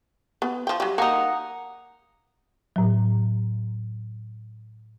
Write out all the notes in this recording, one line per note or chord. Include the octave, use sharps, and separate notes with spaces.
B3
F3 G5
F#3 G3
A#3 D#4 F#5 A#5 D#6
A2 F#3